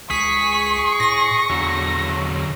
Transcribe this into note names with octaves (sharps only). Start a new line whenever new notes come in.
C#2 G#4 C#6 B6
A2 A#6
E2 D3 F#3